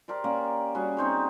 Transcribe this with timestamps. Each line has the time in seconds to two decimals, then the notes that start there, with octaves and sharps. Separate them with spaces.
0.08 G4 A#4 C5 D5
0.24 A#3 C#4 D5
0.75 G3 C#4 F#4 G#4
0.97 C4 D#4 C5 C#5